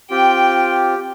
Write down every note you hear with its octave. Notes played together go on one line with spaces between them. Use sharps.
C4 F4 G4 G5